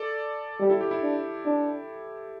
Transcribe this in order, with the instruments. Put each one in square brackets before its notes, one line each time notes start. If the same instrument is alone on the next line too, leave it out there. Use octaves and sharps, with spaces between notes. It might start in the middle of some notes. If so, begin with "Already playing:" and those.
Already playing: [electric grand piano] A4 D5
[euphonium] G3
[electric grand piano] E4 A4
G4
E4
[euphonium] D4
D4